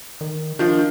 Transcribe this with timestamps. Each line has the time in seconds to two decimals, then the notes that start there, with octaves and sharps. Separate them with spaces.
0.21 D#3
0.59 D#3 F3 D4